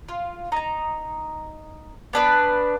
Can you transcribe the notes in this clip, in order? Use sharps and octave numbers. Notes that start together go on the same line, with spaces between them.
F4
D#4 A#5
B3 D4 B4